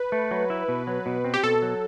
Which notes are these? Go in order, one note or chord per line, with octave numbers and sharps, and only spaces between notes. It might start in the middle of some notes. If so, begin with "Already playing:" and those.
Already playing: B4
A3
F#3
E4
B2
F#3
B2
C4
G4
B2 A4
F#3